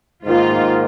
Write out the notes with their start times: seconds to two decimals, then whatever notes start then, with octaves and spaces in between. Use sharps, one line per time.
0.25 G#2 D#3 A#3 F4